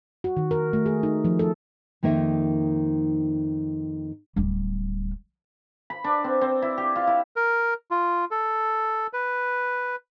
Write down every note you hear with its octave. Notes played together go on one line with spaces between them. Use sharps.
F#4
D#3
A#4
A3
G#4
D#4
F3
A4
F2 D#3 A#3 D#4 E5
D1 G3
B5
D4
C4
C4
E4
G4
F4
E4
A#4
F4
A4
B4